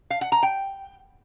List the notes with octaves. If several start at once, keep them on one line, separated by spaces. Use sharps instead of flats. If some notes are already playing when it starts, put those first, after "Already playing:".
F5
F#5
A#5
G5